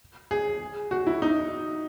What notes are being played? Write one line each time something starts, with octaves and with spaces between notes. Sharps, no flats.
G#4
F#4
E4
D#4